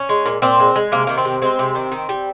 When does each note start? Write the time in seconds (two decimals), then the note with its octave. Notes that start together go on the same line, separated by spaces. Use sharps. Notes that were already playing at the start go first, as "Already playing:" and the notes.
Already playing: C#4
0.09 G#3
0.26 A#2
0.42 A#2 C4
0.60 G#3
0.76 G#3
0.92 C3 A#3
1.07 D#3 A#3
1.18 C4
1.25 C3
1.42 G#3 C4
1.59 C3
1.75 D#3
1.92 D#3
2.09 G3